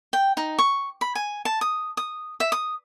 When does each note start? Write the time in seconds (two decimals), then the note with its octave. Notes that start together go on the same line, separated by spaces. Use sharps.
0.13 G5
0.37 D#4
0.59 C#6
1.01 B5
1.15 G#5
1.45 A5
1.61 D#6
1.97 D#6
2.40 E5
2.52 D#6